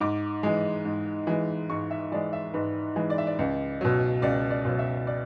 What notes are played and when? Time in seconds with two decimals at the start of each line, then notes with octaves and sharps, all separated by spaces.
0.01 G#2 D6
0.43 E3 G#3
0.85 G#2
1.27 E3 G#3
1.70 G#2 C#6
1.91 E5
2.12 E3 G#3 D5
2.33 E5
2.54 G#2 B4
2.96 E3 G#3
3.10 D5
3.18 E5
3.27 D5
3.39 C#2
3.81 B2 F#3
4.22 C#2 D5
4.51 D5
4.65 B2 F#3
4.79 E5
5.07 D5